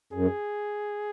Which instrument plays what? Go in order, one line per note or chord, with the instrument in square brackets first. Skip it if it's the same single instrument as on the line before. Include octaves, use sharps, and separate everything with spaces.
[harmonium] F#2 [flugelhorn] G#4